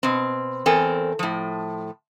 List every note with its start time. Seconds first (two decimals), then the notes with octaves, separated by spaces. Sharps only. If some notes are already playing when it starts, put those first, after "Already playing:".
0.03 B2 C4
0.66 E2 C4 A4 A#4 G#5
1.19 A2 F3